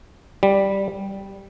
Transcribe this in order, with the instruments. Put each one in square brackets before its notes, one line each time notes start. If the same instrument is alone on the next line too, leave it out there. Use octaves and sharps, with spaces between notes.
[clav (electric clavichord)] G3